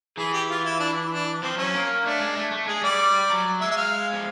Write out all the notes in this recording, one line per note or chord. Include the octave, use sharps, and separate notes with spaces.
E3 G#4
G4
F4
E4
D4
D4
F3 C4
F#3 C#4
A#3
A3 D4
G#3
A3
A3
G#3 G#4
G3 D5
F#3
G#3 E5
E5
F5
F3